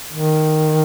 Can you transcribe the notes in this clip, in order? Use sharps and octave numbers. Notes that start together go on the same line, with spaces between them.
D#3